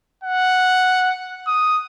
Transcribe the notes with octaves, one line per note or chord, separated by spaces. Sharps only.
F#5
D#6